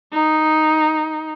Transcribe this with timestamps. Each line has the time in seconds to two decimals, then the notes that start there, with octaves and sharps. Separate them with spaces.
0.13 D#4